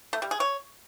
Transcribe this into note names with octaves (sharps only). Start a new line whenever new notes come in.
A3
G3
G#4
C#5